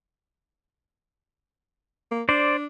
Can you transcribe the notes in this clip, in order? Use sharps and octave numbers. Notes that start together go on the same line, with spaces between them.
A#3
D4 C5 D5